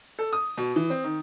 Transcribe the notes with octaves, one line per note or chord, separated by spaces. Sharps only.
A4
D#6
B2
E3
C4
D#3